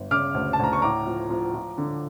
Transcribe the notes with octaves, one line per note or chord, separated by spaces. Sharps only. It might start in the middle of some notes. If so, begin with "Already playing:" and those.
Already playing: G1
C#3 D6 F6
D2
A5
D2 A#5
C#6
A2 A#5 D6
F3
F3
F3
D3